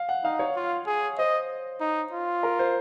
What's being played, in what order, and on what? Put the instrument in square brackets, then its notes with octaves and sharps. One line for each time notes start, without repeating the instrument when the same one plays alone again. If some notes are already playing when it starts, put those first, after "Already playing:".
Already playing: [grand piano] F5
F#5
[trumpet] D#4 [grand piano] F5
[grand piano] C#5
[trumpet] F4
G#4
[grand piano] C5 [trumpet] D#5
[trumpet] D#4
F4
[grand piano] A#4
C5